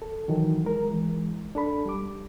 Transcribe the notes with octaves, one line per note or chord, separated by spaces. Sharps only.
A4
D#3 E3 F#3
G#3 A#4
E3 G#3
D4 A4 B5
G3 D6